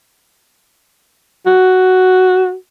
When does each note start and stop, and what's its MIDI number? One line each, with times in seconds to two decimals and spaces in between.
1.46 2.54 66